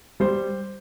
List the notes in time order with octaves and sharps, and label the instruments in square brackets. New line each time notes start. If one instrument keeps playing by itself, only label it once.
[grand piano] G3 C5